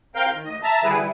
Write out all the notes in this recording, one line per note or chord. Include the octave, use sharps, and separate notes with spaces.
C4 A#4 F5 G5 F6 G6
D#3
D2 D#5
E5 A5 A#5
D3 E3 G3 E4 G#4 B4
G3 E4